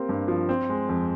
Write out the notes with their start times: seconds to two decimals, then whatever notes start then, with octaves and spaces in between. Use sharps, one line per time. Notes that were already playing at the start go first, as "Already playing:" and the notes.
Already playing: A#3 C4 G4
0.09 G2
0.28 F3
0.49 C4
0.70 G#3
0.89 F2